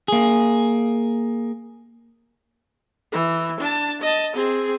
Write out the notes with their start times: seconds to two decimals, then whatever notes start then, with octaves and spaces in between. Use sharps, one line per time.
0.08 A#3 G#4
3.12 E3
3.60 D4 A5
4.01 D#5 A5
4.35 C4 G#4